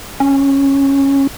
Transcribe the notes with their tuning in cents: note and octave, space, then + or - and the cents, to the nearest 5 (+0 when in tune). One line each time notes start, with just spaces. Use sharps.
C#4 -10